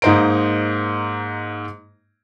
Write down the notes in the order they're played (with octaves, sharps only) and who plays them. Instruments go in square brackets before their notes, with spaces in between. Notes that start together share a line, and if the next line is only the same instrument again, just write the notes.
[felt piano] G#2 A#3 D#4 C5 A#5 D7